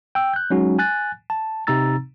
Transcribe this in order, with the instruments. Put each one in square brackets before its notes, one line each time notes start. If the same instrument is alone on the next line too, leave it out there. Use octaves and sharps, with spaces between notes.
[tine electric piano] G5 E6
F#6 G6
F#3 G#3 C#4 D#4 F#4
G#5 F#6 A6
A5
C3 C4 D#4 A#5 E6 A6